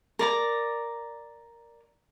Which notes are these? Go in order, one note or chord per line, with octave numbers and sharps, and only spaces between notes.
A#4 D5 A#5